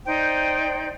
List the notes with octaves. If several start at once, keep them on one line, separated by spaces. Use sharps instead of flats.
D#4 C5 D5 G5